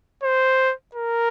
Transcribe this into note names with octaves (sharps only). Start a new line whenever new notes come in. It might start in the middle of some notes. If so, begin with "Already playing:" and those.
C5
A#4